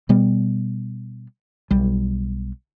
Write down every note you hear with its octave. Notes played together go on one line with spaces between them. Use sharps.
B2 G3 B3
B1 G3